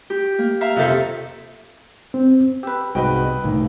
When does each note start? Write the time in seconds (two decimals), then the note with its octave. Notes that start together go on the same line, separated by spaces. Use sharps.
0.10 G4
0.39 A#3
0.61 E5 F5 A#5
0.76 F2 C3 D#3 A4 E5
2.14 C4
2.63 G4 B4 E6
2.95 C2 G#2 B2 F#4 B4 D#5 G5
3.44 C2 A2 D#3 A#3